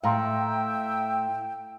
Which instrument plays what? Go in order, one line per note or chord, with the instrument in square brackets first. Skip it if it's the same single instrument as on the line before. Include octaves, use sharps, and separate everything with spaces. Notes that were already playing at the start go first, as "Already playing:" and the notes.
[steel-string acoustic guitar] A2 [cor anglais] E5 [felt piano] F5 A#5 C6 [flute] G5